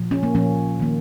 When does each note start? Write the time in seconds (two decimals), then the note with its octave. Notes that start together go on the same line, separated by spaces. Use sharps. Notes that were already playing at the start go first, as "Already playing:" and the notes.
Already playing: A#2 F3
0.11 C#4
0.23 A#3
0.35 A#2 F3 A#3 C#4
0.80 D#3 A#3